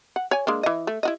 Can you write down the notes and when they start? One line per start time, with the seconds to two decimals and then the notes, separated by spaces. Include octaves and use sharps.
0.16 F#5
0.31 C#5 G#5
0.47 G#3 A#3 D4
0.63 E3 D#5
0.87 A3
1.03 E4 F#4 D#5